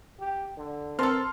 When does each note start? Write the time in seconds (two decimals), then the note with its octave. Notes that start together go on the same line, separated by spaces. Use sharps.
0.20 G4
0.57 D3
0.99 B3 C4 A4 A#4 A5 C6 F6